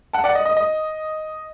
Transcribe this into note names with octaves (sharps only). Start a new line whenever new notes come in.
F#5 A5
D5 F#5
D#5
D#5
D#5